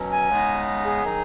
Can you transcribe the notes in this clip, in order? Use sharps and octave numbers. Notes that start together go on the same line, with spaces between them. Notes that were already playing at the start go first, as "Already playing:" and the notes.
Already playing: B2 F#3 C#4
G#5
C#3 G#3 B3 D#4
G#4
D#3 F#3 D#4